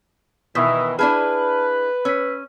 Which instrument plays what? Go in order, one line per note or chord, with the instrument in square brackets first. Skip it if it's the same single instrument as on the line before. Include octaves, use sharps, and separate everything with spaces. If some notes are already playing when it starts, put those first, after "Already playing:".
[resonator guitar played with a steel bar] B2 [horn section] D#3 E3 E4 [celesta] C#6 D#6 B6
[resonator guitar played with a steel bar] D4 E4 G#4 [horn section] B4 [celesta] A5 B5 F6
[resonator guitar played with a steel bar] C#4 [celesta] E6 B6